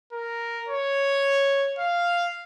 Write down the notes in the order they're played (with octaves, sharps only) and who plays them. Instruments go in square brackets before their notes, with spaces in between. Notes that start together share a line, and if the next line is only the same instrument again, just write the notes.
[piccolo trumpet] A#4
C#5
F5